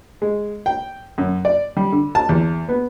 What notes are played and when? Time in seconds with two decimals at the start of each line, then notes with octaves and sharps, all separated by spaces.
0.22 G#3
0.66 G5
1.18 F#2
1.45 D5
1.77 G3
1.92 D3
2.15 A5
2.29 E2
2.69 B3